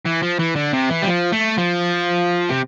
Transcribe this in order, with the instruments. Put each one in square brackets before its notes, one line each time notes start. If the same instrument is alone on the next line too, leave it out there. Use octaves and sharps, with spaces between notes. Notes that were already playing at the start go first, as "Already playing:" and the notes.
[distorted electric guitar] E3
F3
E3
D3
C3
E3
G3
F3
A3
F3
C3